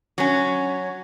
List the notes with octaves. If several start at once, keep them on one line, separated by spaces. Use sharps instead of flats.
F#3 C#4